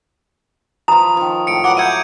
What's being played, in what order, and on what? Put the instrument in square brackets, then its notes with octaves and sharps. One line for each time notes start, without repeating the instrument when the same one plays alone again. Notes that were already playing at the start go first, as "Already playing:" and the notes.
[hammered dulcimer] F3 B4 [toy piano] A#5 B5 [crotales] D#6
[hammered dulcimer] D#3 F3
[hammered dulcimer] A2 A4 [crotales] C#7 D7
[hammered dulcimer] F#3 B4 [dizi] F#5 [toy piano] D6
[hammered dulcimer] E5 A#5 [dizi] F#5 [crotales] G6 G#6 D#7